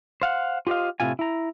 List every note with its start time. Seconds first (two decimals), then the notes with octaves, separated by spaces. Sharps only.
0.22 C5 F5 F#5
0.67 F4 G4 C5 D#5 F5
1.00 A2 C3 D#3 E4 F4 G#5
1.19 E4 A#5